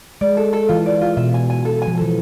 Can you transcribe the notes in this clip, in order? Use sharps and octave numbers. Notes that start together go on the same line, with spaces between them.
G#3 D5
A4
A4
E3 F4
D5
F4
B2 E5
G#5
G#5
A4
G#5
F3
E3 A4